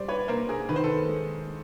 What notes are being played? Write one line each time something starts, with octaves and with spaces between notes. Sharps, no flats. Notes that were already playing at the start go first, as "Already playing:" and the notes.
Already playing: G3 C5 D5
B4 C#5
A#3 A#4 C5
G#4 A#4
D#3 B4
C5
A4 B4
G#3